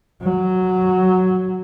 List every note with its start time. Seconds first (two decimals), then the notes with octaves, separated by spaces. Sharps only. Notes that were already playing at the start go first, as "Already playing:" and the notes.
0.22 F#3